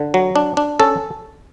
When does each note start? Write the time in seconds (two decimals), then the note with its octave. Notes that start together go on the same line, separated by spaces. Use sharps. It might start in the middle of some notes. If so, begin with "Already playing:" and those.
Already playing: D3
0.14 F#3
0.36 D4
0.57 D4
0.79 C#4 A4